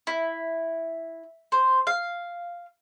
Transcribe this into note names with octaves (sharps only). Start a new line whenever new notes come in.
E4
C5
F5